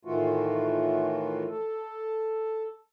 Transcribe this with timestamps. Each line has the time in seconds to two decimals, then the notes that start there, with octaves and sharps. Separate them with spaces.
0.05 A2 D#3 E3 A3 F4 F#4
1.48 A4